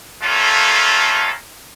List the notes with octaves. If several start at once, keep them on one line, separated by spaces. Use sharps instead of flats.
G3 A3 A#3 C#4 F4 A4